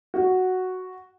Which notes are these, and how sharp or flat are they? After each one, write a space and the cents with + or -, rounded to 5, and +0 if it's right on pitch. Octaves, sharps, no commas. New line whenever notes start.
F#4 +0